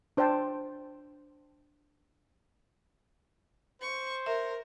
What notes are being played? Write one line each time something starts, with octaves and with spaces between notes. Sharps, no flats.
D4 C5 D5 G5 A5
C5 C#6
A#4 E5